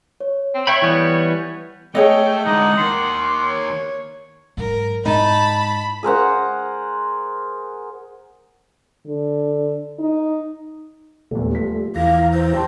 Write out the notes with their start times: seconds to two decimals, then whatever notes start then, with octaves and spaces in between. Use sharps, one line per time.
0.20 C#5
0.54 C4
0.67 C#5 E5 G5 B5 G6
0.82 E3 G3 B3
1.95 A3 G#4 C#5 D#5 G5
2.46 D3 G#3 D#4 F#5
2.78 D#3 A#3 C6
3.44 C#5
4.57 G#2 F#3 A#4
5.05 G#2 D#4 A5 B5
6.03 G#4 A#4 C5 F#5
9.06 D3
9.99 D#4
11.31 D#1 A#1 E2 G3 A3
11.52 F3 B6
11.96 E2 E3 F5 A#5
12.32 C5
12.53 G4 G5 A5 C6